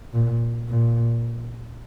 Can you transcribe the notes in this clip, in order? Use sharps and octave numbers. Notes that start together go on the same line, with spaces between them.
A#2
A#2